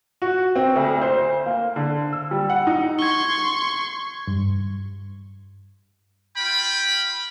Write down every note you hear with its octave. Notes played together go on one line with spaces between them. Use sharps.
F#4
C4
D2
C5
A#3
D3
E6
G3
F#5
D#4
C6 C#6 G#6 G7
G2
F4 G5 B5